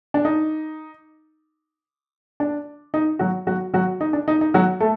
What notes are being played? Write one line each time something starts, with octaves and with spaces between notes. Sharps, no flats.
D4
D#4
D4
D#4
F#3 F#4
F#3 F#4
F#3 F#4
D#4
D4
D#4
D#4
F#3 F#4
A3 A4